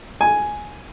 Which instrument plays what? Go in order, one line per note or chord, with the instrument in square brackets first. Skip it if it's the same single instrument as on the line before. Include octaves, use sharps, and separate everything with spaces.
[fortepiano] G#5